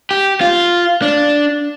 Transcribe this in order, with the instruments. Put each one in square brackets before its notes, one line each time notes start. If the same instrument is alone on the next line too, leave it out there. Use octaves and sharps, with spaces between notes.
[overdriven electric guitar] G4
F4
D4